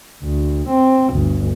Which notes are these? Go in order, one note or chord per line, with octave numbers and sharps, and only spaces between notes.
D2
C4
G1 D2